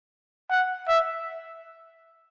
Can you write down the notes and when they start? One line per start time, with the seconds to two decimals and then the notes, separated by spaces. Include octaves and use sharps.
0.50 F#5
0.88 E5